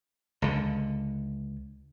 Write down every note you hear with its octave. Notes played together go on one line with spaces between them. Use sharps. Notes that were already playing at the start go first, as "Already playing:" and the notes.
C#2 D3